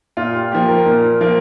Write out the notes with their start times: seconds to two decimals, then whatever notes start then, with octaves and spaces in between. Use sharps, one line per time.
0.17 A#2 F4
0.35 G4
0.51 F3 A#3 G4
0.68 A#4
0.86 A#2
1.21 F3 A#3